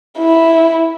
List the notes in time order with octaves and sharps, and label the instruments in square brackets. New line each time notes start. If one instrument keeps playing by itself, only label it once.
[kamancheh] E4